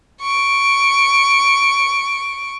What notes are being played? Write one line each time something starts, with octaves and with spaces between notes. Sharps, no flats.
C#6 D7